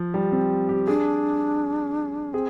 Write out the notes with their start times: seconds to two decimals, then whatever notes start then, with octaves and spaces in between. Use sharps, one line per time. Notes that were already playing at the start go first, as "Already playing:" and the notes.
Already playing: F3
0.14 G3
0.32 C4
0.69 G4
0.87 D4 G#4
2.33 C4 G#4